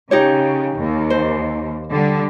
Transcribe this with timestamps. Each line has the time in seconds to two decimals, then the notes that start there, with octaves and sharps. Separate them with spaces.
0.11 C#3 D#4 G4 C#5
0.77 D#2
1.10 C5
1.90 D3 G3